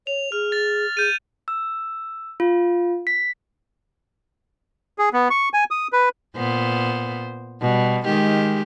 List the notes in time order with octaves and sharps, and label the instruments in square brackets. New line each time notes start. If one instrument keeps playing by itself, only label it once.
[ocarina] C#5 [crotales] F7
[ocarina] G#4 [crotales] F6
[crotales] A6
[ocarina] G#4 [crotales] G6 D#7
[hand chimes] E6
F4
B6
[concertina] G#4
B3
C#6
G#5
D#6
B4
[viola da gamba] A#2 B3 C5
B2 G3
D#3 G#3 G4